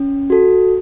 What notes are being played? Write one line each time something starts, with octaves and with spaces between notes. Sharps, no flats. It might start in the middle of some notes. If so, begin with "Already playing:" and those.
Already playing: C#4
F#4 A4